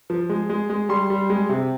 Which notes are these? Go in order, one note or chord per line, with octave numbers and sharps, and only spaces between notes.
F3
G#3
G#3
G#3
G3 C6
G3
G#3
C3